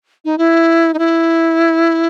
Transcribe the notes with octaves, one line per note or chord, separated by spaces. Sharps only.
D#4
E4
D#4
E4